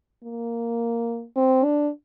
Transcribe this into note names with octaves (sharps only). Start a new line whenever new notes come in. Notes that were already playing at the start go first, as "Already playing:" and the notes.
A#3
C4
D4